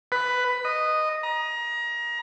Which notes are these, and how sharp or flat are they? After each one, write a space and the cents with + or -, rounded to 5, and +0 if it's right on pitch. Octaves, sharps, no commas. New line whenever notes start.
B4 +10
D#5 -10
A#5 +30